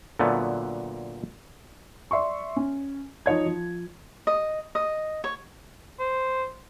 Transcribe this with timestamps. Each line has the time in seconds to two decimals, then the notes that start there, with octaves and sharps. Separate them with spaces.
0.19 A#2 D3 F#3 A3 B3
2.11 D5 E5 C6 C#6
2.56 C#4
3.26 F3 D#4 C#5 G#6
3.46 F3
4.27 D#5
4.75 D#5
5.24 C#5
5.99 C5